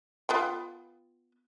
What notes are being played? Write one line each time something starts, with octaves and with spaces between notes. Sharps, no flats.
B3 F4 G5